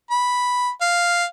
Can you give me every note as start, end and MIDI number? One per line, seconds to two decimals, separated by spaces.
0.11 0.70 83
0.81 1.25 77